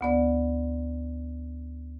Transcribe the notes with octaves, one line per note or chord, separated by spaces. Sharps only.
D2 B3 D5